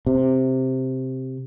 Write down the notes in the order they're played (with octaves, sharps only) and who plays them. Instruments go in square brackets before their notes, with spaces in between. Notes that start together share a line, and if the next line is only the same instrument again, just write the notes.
[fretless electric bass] C3